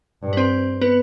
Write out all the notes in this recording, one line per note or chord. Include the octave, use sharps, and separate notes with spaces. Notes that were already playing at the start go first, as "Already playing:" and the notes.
G2
B4
C4 C5
B3 B4